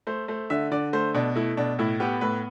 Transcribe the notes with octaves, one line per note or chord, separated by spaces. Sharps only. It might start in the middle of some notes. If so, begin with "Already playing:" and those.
A3 C5
A3 C5
D3 E5
D3 D5
A3 C5
B2 D4
A3 E4
B2 D4
A2 E4
B3 G4
A2 B4